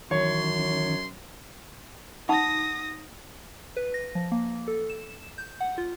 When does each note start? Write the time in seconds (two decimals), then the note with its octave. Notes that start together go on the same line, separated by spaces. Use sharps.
0.11 F#2 D#3 E3 C#4 C#5 C6
2.29 D#4 F#5 B5 D#6 A#6
3.77 B4
3.94 A#6
4.15 F3
4.32 A#3
4.68 A4
4.90 E7
5.38 G6
5.60 F#5
5.78 F4